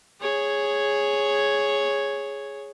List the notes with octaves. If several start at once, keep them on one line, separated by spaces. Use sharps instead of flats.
G#4 C#5